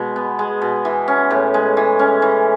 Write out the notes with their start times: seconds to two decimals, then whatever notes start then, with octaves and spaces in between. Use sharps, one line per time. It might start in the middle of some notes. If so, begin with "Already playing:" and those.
Already playing: B2 G#3
0.16 B3
0.39 G#3
0.62 B2
0.85 E3
1.08 C#4
1.31 A2
1.54 G#3
1.77 E3
1.99 C#4
2.22 E3